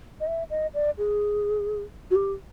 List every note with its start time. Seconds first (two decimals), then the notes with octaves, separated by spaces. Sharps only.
0.20 D#5
0.27 E5
0.50 D#5
0.74 D5
0.98 G#4
2.11 F#4
2.15 G4